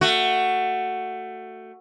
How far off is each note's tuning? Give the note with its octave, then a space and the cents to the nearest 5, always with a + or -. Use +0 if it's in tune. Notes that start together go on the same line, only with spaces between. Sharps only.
A3 +15 F#4 +0